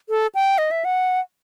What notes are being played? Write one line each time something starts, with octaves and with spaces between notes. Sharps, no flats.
A4
G5
D#5
E5
F#5